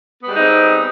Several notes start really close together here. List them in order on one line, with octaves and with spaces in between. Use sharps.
B3 G3 G#3 D#4 C4